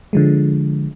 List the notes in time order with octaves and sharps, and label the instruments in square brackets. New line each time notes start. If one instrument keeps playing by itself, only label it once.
[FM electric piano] D3 F3 G#3